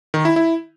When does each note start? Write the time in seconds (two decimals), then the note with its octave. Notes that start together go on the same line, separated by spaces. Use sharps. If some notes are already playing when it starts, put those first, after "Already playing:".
0.14 D#3
0.25 E4
0.36 E4